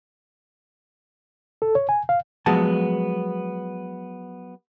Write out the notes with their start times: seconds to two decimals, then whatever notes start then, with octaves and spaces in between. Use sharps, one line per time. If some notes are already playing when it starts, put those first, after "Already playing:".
1.62 A4
1.75 C#5
1.89 G#5
2.09 F5
2.46 F3 F#3 G#3 B3 A5